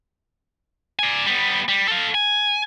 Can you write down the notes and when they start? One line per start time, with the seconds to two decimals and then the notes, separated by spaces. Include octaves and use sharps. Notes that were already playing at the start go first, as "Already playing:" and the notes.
0.99 D5 G#5
1.26 G3 B3
1.68 G3
1.88 A4 F5
2.14 G#5